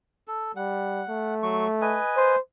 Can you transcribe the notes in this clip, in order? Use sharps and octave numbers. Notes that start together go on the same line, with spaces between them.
A4
G3 F#5
A3
F#3 C#6
B4 D#5 G#5
C5